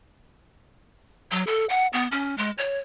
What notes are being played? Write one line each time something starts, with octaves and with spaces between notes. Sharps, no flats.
F#3
A4
F#5
B3
C#4
G#3
C#5